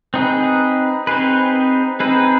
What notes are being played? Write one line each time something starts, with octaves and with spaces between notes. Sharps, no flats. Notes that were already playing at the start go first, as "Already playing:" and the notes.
C4 D#4 G#4 B4
C4 D#4 G#4 B4
C4 D#4 G#4 B4